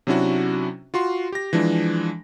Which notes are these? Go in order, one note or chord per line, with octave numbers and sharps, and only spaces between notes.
C3 F#3 C#4 D4 E4 F#4
F4 F#4 C6
G4 A#6
E3 F3 G#3 D4